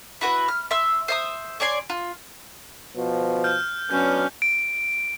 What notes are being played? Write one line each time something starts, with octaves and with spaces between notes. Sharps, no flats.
E4 F#4 B4
F6
E5 C6 E6
C5 E5 D#6
C#5 D5 G#5 C6
F4
B2 F3
F6 G6
F#3 B3 C#4 D4 G6
D7